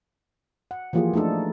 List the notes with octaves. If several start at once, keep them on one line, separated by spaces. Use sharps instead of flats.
F#5
E3 F3 A#3 F4 G4 G#4
A3 D4 D#4 A4